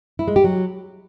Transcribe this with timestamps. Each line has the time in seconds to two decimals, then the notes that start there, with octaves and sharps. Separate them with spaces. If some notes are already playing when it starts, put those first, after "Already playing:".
0.19 E4
0.28 G#3
0.36 G4
0.44 F#3